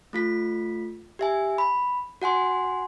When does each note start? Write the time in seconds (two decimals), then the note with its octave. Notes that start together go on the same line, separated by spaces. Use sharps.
0.13 A3 F4 B6
1.19 G4 E5 G#5
1.58 B5
2.22 F#4 F#5 G#5 C6